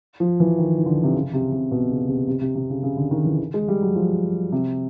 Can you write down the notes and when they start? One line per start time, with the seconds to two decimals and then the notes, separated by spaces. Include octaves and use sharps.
0.20 F3
0.40 E3
0.59 D#3
0.78 D#3
0.86 D3
1.03 C3
1.15 C#3
1.33 C3
1.52 C3
1.71 B2
1.90 C#3
2.09 C3
2.28 C3
2.41 C3
2.55 C3
2.70 C#3
2.83 C#3
2.97 D3
3.11 D#3
3.25 E3
3.39 D#3
3.54 G#3
3.68 G3
3.82 F#3
3.96 F3
4.52 C3